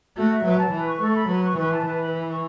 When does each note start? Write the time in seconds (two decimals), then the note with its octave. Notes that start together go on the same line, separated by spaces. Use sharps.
0.16 A3 F#4
0.30 E5
0.44 F#3 B4
0.58 A5
0.72 E3 B4
0.86 C#6
1.00 A3 A4
1.15 B5
1.28 F#3 B4
1.42 C#6
1.57 E3 B4
1.70 A5
1.85 E3 B4
2.00 B5
2.13 B4
2.28 C#6